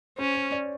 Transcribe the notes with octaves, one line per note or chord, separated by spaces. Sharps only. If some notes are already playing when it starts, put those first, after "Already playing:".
C#4 C5
C#5
D5